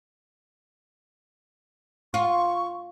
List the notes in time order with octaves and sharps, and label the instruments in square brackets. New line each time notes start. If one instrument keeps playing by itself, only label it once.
[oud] F4 [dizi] C#6